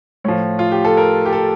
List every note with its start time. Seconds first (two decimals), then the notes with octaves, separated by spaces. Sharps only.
0.24 A2 F3 C#5
0.59 F4
0.72 G4
0.85 A4
0.97 A#4
1.25 G4
1.33 A4